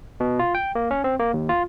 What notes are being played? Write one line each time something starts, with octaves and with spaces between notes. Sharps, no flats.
B2
F4
G5
A#3
C#4
C4
A#3
D#2
F4